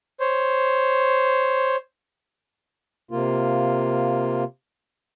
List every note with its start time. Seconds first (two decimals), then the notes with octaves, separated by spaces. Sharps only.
0.20 C5 C#5
3.11 C3 A#3 F4